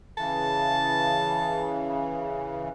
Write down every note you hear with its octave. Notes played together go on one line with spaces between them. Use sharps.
C#3 E3 A5